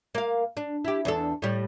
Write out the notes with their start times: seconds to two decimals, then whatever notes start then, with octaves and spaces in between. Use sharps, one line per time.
0.15 A#3 F5
0.57 D4
0.85 E4 G4
1.05 E2 D4 A4
1.42 A2 G3